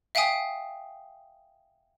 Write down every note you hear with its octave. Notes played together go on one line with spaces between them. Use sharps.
E5 F5 G5 G#5 D#6